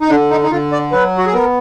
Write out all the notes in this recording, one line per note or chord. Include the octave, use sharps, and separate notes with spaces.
D#4
D3 D4
D#4
D#4
D3 F4
D5
F#3 B4
F#4
G#4
B3 A#4